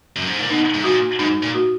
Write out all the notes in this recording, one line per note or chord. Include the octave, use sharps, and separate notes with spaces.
F#2
G#2
A#2
B2 D#4
G#2
A#2 F#4
G#2 D#4
A#2
F#4